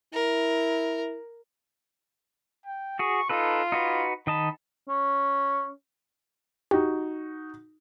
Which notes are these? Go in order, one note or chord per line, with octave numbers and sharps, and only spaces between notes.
E4 A#4
G5
F#4 G#4 C#6
D#4 F4 A4 B4
D#4 F#4 B4
D#3 D#5 A5 B5
C#4
D#4 F#4 G4